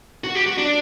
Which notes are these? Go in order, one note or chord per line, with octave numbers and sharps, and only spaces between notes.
F#4
G4
F#4
D4